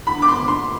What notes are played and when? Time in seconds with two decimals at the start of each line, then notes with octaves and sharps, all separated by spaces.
0.07 D3 B5
0.22 D6
0.28 C6
0.38 D3
0.48 C6